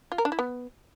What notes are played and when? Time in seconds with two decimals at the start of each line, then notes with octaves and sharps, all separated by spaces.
0.12 F4
0.18 A#4
0.25 D4
0.32 E4
0.39 B3